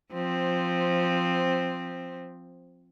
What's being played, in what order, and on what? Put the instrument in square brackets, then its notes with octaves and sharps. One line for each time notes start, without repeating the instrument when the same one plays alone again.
[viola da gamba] F3 C4